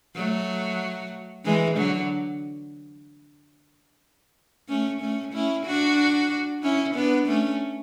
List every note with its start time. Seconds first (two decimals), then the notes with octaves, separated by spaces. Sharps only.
0.16 F#3 A3
1.45 E3 G#3
1.77 D3 F#3
4.69 A3 C#4
5.01 A3 C#4
5.34 C#4 E4
5.66 D4 F#4
6.63 C#4 E4
6.95 B3 D4
7.27 A3 C#4